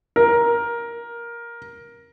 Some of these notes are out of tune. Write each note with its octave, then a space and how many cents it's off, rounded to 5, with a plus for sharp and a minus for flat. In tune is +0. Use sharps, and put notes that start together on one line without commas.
A#4 +10